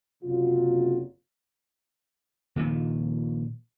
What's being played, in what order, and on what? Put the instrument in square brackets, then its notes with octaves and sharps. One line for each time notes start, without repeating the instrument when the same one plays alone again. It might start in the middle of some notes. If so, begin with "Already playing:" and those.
[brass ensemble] F#1 C3 F#3 F4
[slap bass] A#2 D#3 F3